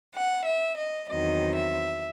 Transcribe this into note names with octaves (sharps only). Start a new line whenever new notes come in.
F#5
E5
D#5
E2 D#3 F#3 C4 D#5
E5